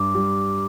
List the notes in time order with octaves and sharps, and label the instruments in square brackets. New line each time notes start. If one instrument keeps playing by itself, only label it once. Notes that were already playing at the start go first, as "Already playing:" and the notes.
Already playing: [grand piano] G2 [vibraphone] D6
[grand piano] G3